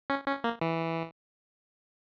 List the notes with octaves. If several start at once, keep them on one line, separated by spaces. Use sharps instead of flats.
C#4
C#4
A#3
E3